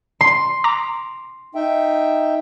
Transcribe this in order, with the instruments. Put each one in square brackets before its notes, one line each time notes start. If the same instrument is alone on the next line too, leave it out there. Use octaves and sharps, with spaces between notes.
[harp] C6
[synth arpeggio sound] A#5 D6
[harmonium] D#4 E5 G5